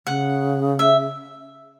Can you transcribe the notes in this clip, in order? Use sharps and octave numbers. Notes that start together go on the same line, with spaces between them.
C#3 F#5
E5